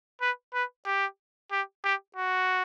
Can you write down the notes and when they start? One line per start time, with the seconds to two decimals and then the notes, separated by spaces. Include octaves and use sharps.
0.21 B4
0.54 B4
0.86 G4
1.51 G4
1.84 G4
2.16 F#4